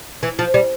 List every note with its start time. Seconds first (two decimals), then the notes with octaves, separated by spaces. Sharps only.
0.23 E3
0.39 F3
0.54 G3